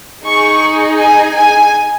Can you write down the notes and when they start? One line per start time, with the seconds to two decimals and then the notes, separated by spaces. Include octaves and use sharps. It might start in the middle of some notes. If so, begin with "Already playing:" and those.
0.25 D#4 G#4 C#6
0.98 G#5
1.34 G#5